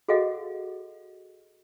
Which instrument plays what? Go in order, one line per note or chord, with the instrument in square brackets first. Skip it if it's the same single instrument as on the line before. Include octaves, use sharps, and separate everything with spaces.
[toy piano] F#4 G#4 A4 D#5 F5 F#5